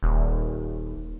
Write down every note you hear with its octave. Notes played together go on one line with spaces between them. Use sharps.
D#1